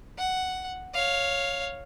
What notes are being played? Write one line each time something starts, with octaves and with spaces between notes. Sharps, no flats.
F#5
C#5 F5